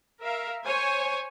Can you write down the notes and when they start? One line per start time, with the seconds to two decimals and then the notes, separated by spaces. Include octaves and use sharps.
0.22 A#4 E5 F5
0.64 C5 C#5 G#5